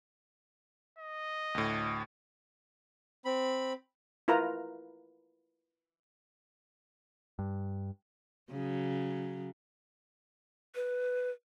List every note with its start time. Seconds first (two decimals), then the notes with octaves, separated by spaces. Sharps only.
0.98 D#5
1.55 D2 A2
3.25 C4 B5
4.28 E4 F4 A#4 B4 A#5
7.39 G2
8.51 C#3 F#3
10.75 B4